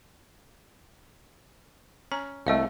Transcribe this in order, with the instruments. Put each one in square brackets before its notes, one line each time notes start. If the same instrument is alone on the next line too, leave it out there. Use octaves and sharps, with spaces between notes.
[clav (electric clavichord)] C#4 [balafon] A#5
[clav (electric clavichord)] C2 A3 [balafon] G#3 D#5 F5